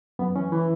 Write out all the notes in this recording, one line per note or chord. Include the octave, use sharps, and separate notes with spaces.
F#2 B3
E3 C#4
E3